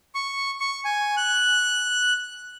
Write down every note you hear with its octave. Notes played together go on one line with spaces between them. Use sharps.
C#6
C#6
G#5
F#6